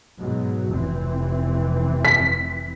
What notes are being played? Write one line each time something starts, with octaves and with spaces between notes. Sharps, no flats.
G#2 B2 F#3
F1 E3 C4
B6